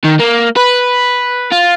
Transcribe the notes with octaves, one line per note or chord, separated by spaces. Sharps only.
D#3
A#3
B4
F4